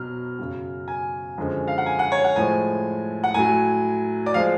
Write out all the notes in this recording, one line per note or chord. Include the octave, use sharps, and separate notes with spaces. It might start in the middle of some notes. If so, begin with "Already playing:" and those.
Already playing: B2 F#3 F6
F#2 C#3 F#3
G#5
F#2 D3 F3 G#3
F5
F#5
G#5
F#5
C#5
F#5
A2 F3 G#3 G#5
F#5
A2 F#3 G#5
D5
F3 G#3 F5